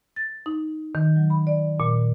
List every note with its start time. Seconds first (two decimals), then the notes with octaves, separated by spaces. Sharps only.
0.16 A6
0.46 D#4
0.95 D#3
1.16 F#3
1.30 B5
1.47 D5
1.80 A#2